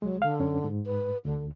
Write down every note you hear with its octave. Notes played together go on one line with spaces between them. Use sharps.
C2 F#3 G#3
D3 F5
F#2 C#4
G#2
B4
D2 D3